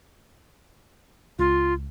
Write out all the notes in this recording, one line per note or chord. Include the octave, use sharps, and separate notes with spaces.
C#2 F4